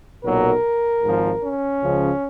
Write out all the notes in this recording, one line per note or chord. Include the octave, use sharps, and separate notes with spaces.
B1 A#2 F#3 A#4
G#1 G#2 F3
C#4
C#2 C#3 F3